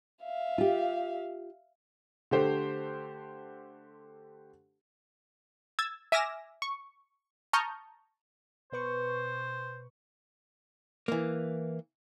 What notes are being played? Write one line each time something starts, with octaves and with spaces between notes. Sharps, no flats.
E5 F5
F4 G4
D3 A3 G4 C5
E6 G#6 A6
E5 G#5 D6 F6 A#6 E7
C#6
A5 A#5 C#6 D#6 F6 G6
B2 B4 C5 C#6
E3 A#3